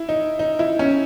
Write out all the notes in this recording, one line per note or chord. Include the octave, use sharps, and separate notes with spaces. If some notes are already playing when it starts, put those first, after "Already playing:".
Already playing: E4
D#4
D#4
E4
C#4